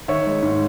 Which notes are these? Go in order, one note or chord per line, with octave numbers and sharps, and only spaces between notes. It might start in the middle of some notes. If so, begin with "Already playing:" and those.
D#3 C#5 E5
G#3
G#2